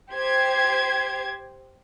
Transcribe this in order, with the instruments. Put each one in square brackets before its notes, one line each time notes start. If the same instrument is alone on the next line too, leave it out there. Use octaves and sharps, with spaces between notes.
[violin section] G4 C5 G#6